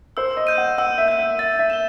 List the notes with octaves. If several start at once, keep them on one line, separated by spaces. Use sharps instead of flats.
C5 E6
D#5
G6 D#7
F#5
F#5 E6
E5
G6 D#7
E5
E5 A6
E5
E7 G7